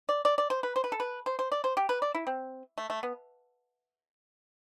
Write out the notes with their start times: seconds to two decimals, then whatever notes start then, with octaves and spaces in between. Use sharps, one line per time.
0.09 D5
0.25 D5
0.38 D5
0.50 C5
0.63 B4
0.76 C5
0.84 B4
0.92 A4
1.00 B4
1.26 C5
1.39 C5
1.52 D5
1.64 C5
1.77 G4
1.89 B4
2.02 D5
2.15 E4
2.27 C4
2.78 A3
2.90 A3
3.03 B3